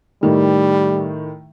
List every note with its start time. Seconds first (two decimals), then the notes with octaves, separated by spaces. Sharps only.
0.23 A2 D#3 G3